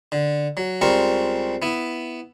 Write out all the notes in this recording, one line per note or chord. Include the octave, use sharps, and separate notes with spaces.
D3
F#3
C#2 G3 C4 A#4 C#6
B3 E4